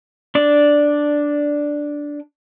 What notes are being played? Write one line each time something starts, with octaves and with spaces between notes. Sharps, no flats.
D4 D5